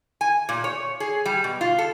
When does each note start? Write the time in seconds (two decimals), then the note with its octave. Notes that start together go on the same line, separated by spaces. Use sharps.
0.21 G#5
0.49 A#2
0.64 C#5
1.00 G#4
1.25 G3
1.44 B2
1.61 F4
1.79 A4